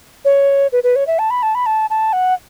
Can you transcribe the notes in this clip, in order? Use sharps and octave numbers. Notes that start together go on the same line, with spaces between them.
C#5
B4
B4
C#5
E5
A5
B5
A5
B5
A5
A5
F#5